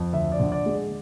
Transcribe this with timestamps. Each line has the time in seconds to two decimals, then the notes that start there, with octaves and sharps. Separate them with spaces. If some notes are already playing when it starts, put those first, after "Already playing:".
Already playing: F2
0.13 D2 E5
0.32 D5
0.40 D3
0.52 D5
0.66 G#3